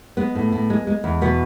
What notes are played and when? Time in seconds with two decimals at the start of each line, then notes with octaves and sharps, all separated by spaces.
0.17 G#3 B3
0.35 A2
0.52 A2
0.70 G#3
0.87 G#3
1.04 E2
1.21 B2 B3